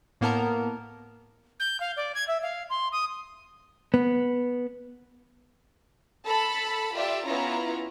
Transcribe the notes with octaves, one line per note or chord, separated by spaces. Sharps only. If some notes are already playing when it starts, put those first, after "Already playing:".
A2 A#3 B3 A#4 A5 A#5
G6
F5
D5
G#6
E5
F5
C6
D#6
B3
A4 A5 B5
F4 G4 D5 E5
B3 C#4 E4 F4 A#5